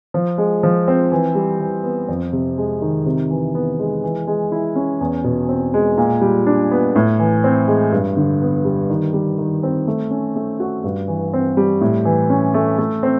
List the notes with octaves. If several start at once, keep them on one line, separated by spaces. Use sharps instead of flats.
F3
G#3
F3
C4
E3
G3
E3
B3
F2
C3
G#3
D#3
C3
E3
B3
G#3
E3
G#3
E4
C#4
E2
B2
C4
G#3
A#2
G3
D4
B3
A2
E3
C4
G#3
G2
D3
B3
G3
D#3
G3
D#3
C4
A3
C#4
A3
F#4
G2
E3
C4
G3
A2
E3
C#4
A3
A3
C4